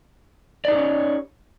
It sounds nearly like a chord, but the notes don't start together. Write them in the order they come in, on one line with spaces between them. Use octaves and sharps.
D5 D#4 G4 C#4 C#5